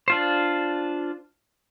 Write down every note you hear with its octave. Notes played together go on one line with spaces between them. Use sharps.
D4 F4 C5